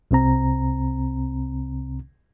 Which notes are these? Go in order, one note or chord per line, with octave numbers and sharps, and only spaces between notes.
C2 C3 C4 A#5